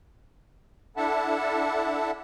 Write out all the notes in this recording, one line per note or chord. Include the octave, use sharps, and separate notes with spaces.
D4 E4 A4 E5 F#5 A5